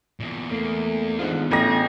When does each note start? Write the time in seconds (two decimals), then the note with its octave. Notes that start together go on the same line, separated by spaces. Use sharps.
0.20 E2 A#2
0.52 E2 A3 A#3
1.19 G#2 B3 D4 F4
1.52 A1 A3 G#4 A#6